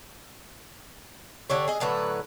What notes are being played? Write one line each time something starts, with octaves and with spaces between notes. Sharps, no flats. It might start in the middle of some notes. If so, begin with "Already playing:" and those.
D3 G4 C#5
G#4 D#5
A2 D3 F#3 B4